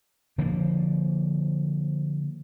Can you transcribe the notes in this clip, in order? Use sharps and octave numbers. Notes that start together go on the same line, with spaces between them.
D3 F3 A#3